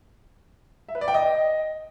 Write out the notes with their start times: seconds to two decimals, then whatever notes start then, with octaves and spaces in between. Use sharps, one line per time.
0.89 E5
0.95 B4
1.01 D5
1.08 G5
1.14 D#5